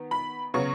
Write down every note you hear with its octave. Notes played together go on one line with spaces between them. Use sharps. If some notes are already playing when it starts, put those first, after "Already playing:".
Already playing: D#3 B3
B5
C#3 F#3 B3 C#6